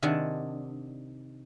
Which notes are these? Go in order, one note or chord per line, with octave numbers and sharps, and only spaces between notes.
C3 D#3 D4 F#5 G#5 A5